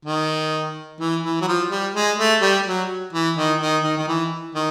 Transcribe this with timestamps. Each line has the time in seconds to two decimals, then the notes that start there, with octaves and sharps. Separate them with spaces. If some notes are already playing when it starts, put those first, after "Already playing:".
0.05 D#3
1.00 E3
1.23 E3
1.41 F#3
1.48 F3
1.71 G3
1.95 G#3
2.18 A3
2.41 G3
2.66 F#3
3.13 E3
3.37 D#3
3.60 D#3
3.84 D#3
3.97 D#3
4.08 E3
4.55 D#3